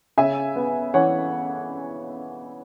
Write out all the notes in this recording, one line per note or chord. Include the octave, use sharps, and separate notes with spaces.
C#3 E5 G#5
B3
E3 C#5 F#5